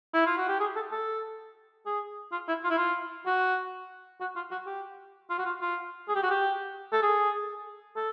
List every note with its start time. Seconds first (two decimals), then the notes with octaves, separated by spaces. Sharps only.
0.14 E4
0.26 F4
0.37 F#4
0.48 G4
0.60 G#4
0.76 A4
0.91 A4
1.86 G#4
2.32 F4
2.48 E4
2.64 F4
2.70 E4
2.77 F4
3.26 F#4
4.20 F#4
4.35 F4
4.51 F#4
4.66 G4
5.30 F4
5.38 F#4
5.46 F4
5.61 F4
6.08 G#4
6.15 G4
6.23 F#4
6.30 G4
6.92 A4
7.02 G#4
7.96 A4